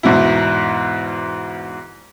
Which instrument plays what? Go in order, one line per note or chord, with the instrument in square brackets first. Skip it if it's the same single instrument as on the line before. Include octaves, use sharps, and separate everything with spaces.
[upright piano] E2 G#2 B2 E4